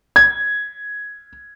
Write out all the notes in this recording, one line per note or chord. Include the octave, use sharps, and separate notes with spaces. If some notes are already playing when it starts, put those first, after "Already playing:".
G#6